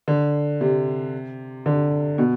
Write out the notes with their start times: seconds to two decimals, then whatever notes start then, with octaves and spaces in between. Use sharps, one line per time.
0.08 D3
0.61 C3
1.66 D3
2.18 B2